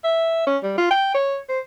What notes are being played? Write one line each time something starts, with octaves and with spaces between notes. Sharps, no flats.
E5
C#4
G3
F4
G5
C#5
C5